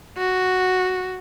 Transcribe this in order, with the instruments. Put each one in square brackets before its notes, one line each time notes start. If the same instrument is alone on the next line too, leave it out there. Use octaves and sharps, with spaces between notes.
[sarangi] F#4